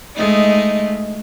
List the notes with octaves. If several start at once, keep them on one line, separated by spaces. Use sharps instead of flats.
G#3 A3 D#4